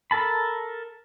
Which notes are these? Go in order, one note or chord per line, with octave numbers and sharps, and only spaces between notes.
A4 A#4 A5 B5